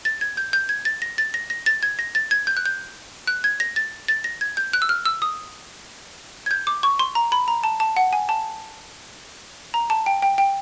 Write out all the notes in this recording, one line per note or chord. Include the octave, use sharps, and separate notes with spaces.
A6
G#6
G6
G6
G#6
A6
A#6
A6
A#6
A#6
A6
G#6
A#6
A6
G#6
G6
F#6
G6
F#6
G#6
A#6
A6
A6
A#6
G#6
G6
F#6
E6
F6
E6
D#6
G#6
G6
D6
C#6
C6
A#5
B5
A#5
A5
A5
F#5
G#5
A5
A#5
A5
G5
G5
G5